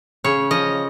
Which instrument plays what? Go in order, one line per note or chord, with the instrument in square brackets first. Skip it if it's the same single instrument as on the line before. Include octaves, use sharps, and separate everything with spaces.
[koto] C#3 C#5
F3 D#5